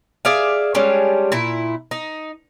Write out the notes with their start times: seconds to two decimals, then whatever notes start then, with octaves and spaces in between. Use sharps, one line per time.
0.25 G#4 D5 E5 F5
0.74 G3 G#3 C#4 D4
1.32 A#2 E4
1.91 D#4